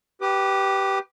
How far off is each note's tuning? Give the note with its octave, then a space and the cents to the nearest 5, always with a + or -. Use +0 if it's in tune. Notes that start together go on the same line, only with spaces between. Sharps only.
G4 -10 B4 +0 D6 +40